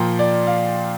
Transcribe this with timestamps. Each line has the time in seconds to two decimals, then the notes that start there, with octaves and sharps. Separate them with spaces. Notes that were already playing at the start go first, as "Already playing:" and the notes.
Already playing: A#2 F3 G5 A#5
0.19 D5
0.47 F5